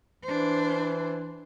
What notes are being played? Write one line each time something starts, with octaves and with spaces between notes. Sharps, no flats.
E3 D4 C5